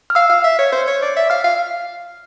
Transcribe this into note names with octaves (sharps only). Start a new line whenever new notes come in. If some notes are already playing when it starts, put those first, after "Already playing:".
F6
F5 E6
F5
E5
C#5
C5
C#5
D5
E5
F5 F6
F5